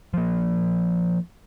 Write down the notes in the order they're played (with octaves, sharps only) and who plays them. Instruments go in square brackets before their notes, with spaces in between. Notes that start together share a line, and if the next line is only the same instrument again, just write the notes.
[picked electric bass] F3 A#3